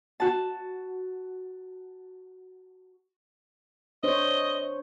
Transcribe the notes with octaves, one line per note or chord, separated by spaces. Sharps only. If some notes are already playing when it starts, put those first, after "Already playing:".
F#4 A5
D4 C5 C#5 D#5